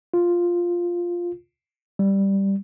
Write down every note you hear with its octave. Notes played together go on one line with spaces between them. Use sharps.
F4
G3